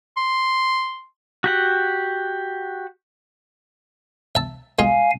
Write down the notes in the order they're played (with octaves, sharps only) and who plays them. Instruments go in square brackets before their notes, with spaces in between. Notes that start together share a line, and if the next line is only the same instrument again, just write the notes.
[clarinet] C6
[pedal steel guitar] F#4 G4 F#5
[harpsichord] E5 A5
[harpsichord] G#3 F4 G#4 [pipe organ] F5 G#5